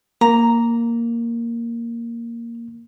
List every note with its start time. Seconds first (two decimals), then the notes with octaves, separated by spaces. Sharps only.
0.21 A#3 A#5